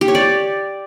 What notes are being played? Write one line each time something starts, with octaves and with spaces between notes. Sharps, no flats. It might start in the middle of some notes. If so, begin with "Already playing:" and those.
G4
C#5
D5